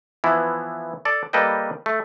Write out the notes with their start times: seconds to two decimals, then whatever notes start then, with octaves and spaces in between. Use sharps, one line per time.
0.24 E3 F3 B3 E4
1.05 A4 D5
1.33 G3 A#3 A4 B4 D#5 G5
1.86 A3